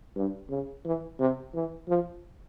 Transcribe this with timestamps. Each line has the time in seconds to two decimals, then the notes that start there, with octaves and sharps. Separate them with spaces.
0.16 G2
0.50 C#3
0.85 E3
1.20 C3
1.55 E3
1.88 F3